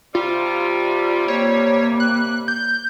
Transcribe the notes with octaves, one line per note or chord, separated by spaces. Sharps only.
C3 G3 F4
A#3 C#5
F#6
G6